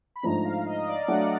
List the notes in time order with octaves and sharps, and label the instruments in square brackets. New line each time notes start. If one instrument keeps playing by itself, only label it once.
[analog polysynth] B5
[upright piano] G#2 F3 A3 D4 [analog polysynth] A#5
[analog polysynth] F5
D#5
D5
[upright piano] F#3 A3 D4 [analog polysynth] F#5